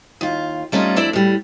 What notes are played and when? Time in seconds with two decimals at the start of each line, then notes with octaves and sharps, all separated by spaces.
0.21 D#2 F4
0.72 G3 A3 C#4 D#4 F4
0.96 F2 D4 E4 A4 D5
1.13 A2 G3